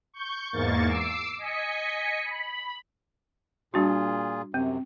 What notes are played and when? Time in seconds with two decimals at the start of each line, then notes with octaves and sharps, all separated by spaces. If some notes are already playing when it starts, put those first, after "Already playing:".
0.14 C#6 G6
0.52 E2 G#2 A#3 C#6 A6
0.88 D6 E6 C7 D7
1.38 D#5 G#5 B6 C#7
2.24 B5
3.74 A#2 G3 D4 F4 F#4 G#4
4.54 F#2 C3 C4